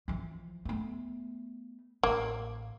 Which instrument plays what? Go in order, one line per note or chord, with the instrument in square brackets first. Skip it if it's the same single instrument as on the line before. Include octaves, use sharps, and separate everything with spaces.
[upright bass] E3 F3
A3 B3
[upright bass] A1 [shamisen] A#3